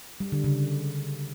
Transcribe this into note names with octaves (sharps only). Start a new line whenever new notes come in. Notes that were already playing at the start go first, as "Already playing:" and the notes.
G3
D3
C#3